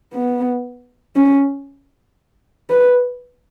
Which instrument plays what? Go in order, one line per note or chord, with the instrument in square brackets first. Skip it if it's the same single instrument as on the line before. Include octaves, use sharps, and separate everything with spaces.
[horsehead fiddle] B3
C#4
B4